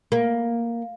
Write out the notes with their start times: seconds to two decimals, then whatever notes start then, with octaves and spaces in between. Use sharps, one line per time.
0.12 A#3